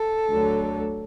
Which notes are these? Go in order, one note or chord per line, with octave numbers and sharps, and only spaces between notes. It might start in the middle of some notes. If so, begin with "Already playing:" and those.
Already playing: A4
D2 D3 F#3